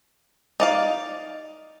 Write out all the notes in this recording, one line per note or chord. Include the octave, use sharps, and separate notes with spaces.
D#4 D5 F5